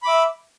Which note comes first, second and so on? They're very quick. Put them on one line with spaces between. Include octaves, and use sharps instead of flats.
B5 D6 E5